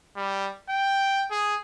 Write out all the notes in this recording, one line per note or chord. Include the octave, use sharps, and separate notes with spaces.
G3
G5
G#4